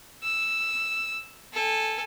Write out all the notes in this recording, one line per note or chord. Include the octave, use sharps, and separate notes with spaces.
E6
A4 G#5